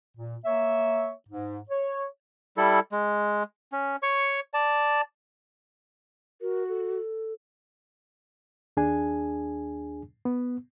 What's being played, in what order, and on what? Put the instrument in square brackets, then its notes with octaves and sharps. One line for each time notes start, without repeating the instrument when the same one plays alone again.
[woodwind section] A#2
A#3 C#5 E5
G#2
C#5
[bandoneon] G3 E4 A4
G#3
C#4
C#5 C#6
D5 A5
[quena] F#4 [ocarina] A#4
[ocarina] A4
[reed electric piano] D#2 D4 G#4 G#5
B3